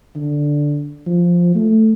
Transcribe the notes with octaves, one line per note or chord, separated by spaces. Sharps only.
D3
F3
A3